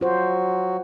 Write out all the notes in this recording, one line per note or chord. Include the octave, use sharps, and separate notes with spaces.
F#3 F4 F#4 C5